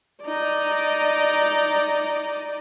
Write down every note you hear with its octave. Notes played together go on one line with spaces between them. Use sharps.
D#4 D5